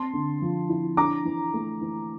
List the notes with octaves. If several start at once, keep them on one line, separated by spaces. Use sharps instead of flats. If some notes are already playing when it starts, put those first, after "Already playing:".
Already playing: C4 A5 C6
D3
F3
E4
D4 A#5 D6
E3
A3
E3